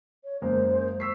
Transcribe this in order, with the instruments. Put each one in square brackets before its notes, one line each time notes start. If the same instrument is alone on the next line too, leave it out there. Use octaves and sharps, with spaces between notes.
[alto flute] C#5
[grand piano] F#2 G#3 A#3 [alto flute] C5
[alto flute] C#6 [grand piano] E6 B6 C7